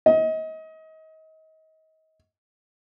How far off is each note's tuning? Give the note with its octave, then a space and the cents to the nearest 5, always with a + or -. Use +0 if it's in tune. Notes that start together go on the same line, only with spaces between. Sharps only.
D#5 +30